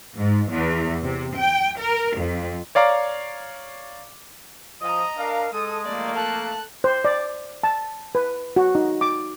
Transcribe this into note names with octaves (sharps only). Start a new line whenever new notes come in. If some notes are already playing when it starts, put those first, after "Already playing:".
G#2
E2
C3
G5
A#4
F2
C#5 D5 F5 A#5 D6
F3 D#5 A#5 D#6
D4 A#4 F5
G#3 A4 D#6
F2 A3 A#3 D5
A4 A5 F#6
C5
D5
A5
B4
F#4
D#4
D6